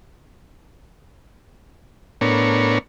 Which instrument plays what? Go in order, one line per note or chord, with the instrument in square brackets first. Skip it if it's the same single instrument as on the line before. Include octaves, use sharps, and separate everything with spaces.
[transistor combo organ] A2 B3 D4 A#4 C#5